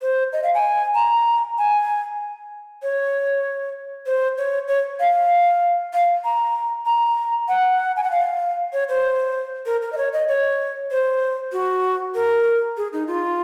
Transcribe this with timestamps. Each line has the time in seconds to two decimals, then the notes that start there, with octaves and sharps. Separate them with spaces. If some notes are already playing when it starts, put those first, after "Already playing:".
0.02 C5
0.33 D#5
0.43 F5
0.54 G#5
0.95 A#5
1.58 G#5
2.82 C#5
4.06 C5
4.38 C#5
4.68 C#5
5.00 F5
5.93 F5
6.24 A#5
6.86 A#5
7.48 F#5
7.96 G#5
8.03 F#5
8.11 F5
8.73 C#5
8.89 C5
9.66 A#4
9.82 A#4
9.92 D#5
9.97 C#5
10.13 D#5
10.28 C#5
10.91 C5
11.52 F#4
12.15 A#4
12.77 G#4
12.93 D#4
13.07 F4